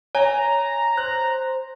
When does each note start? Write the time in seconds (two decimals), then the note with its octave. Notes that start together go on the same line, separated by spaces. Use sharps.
0.15 C#5 G#5 A#5
0.97 C5 F#6